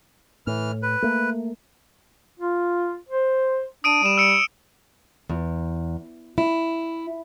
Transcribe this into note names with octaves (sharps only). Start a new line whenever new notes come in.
A2 E3 F6
B4
A3 A#3
F4
C5
D4 D#6 D7 D#7
G3 D7 E7
E6 C#7 D7
E2
E4